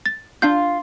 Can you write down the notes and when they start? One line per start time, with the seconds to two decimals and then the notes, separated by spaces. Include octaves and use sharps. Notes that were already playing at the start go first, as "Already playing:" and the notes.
0.06 A6
0.42 D4 F4 F5 G6